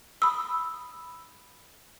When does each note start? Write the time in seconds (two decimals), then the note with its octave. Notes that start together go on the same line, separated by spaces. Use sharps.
0.22 B5 D#6 E6